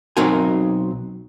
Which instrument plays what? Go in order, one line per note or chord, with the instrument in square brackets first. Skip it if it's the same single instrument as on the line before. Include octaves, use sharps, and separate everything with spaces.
[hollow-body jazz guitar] B1 F#3 C4 D#4 A#4 G#5